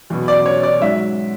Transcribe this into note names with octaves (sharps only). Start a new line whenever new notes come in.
E2 B2 F#3
D5
C#5
D5
G#2 F#3 E5